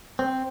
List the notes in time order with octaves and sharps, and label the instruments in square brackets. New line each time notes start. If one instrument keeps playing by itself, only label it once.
[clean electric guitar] C4